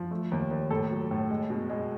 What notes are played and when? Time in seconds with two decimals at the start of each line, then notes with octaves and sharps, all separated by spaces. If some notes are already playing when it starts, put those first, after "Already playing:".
Already playing: F3
0.11 A3
0.32 D#2
0.51 D#2
0.70 A2 A4
0.91 F#3
1.11 A2
1.30 G#3
1.50 B2
1.70 G#3